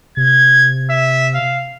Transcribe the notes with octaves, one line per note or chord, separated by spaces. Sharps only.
C3 G#6
E5
F5